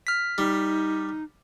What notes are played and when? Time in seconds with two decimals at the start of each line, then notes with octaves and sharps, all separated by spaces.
0.07 F6 B6
0.38 G3 D#4